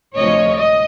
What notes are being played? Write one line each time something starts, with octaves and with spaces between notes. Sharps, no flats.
D2 C3 F3 C#5 D#5
D#5